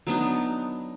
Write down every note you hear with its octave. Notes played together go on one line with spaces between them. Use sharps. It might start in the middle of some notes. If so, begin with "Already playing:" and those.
F#3 B3 D4 D#4